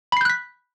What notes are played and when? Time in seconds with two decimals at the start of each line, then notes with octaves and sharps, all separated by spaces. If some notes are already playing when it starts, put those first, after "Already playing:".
0.12 B5
0.17 C7
0.21 G6
0.25 F#6
0.30 B6